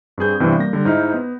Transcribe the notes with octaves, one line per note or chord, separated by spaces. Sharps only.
G2 C4 G#4 G6
G2 C3 E3 G3 B3 C4
G3 A#3 A#6
D3 G3
G#2 D#4 E4 F6
B3